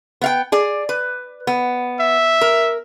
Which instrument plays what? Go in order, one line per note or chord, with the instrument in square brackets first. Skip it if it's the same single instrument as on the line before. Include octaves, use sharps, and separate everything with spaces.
[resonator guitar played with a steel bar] B3 F5 G5
G#4 D5
B4
B3
[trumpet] E5
[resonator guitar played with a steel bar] A#4